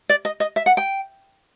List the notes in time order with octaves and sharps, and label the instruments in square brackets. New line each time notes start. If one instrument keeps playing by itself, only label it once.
[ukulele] D5
D#5
D#5
E5
F#5
G5